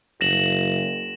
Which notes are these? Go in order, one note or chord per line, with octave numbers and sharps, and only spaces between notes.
F#1 A#6 E7 F#7